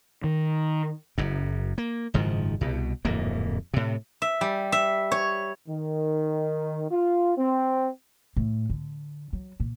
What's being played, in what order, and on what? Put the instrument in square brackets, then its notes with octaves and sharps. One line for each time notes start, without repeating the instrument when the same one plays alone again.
[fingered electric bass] D#3
[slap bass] F#1 F#2
A#3
F#1 G#2 D#3 F3
C2 B2
D1 F2 G#2 A#3
A2 C3
[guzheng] E5
G3
E5
C#5
[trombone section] D#3
F4
C4
[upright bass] A2
D3
F#3
A#2